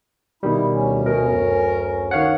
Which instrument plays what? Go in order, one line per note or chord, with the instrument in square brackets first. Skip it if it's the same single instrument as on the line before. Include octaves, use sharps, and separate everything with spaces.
[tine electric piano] B2 D#3 G3 [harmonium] E4
[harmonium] D2 C#4
[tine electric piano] B2 [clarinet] A#4
[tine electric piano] F#2
[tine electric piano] D#3 F5 F#5 [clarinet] C#5